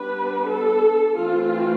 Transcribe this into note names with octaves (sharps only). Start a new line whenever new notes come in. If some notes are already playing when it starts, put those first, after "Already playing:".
Already playing: G3 B3 D4 B4
A4
E3 A3 C4 F4